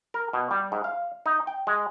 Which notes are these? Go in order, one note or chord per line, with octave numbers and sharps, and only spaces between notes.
A#4
B2
G3
G#2
F5
D#4
G5
G#3